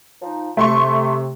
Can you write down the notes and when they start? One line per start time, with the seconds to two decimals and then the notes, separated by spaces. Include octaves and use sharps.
0.21 F3 D#4
0.57 C3 A3 C6 C#6